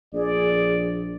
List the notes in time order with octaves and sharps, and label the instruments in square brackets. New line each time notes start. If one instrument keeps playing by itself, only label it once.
[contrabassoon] A#1 [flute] G#4 [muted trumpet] D5